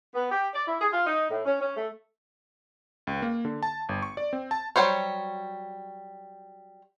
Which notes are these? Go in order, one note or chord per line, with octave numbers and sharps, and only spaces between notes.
B3
G4
D5
E4
G#4
F4
D#4
A2
C#4
C#4
A3
C#2
A#3
D3
A5
G1
C#6
D5
C4
A5
F#3 G3 F#4 C5 C#5